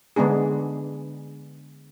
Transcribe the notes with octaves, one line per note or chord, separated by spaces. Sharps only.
D3 G#3 B3 D4 G#4